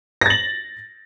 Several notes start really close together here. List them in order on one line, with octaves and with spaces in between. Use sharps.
A#6 A6 F#7